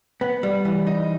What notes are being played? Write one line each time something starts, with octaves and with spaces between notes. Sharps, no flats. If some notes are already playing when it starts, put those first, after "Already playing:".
B3
G3
E3
D#4